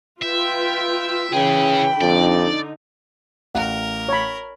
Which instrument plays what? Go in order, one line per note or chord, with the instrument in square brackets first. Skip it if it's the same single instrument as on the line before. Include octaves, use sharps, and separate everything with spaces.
[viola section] F4 B4 G5 [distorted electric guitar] E5
[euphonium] C#3 [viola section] E3 B5 [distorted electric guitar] C#4 G#4 [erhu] G5
[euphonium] F2 [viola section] D3 D#4 [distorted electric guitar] D5
[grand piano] A1 F5 [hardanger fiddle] A#4 [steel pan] F#5
[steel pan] C#5 B5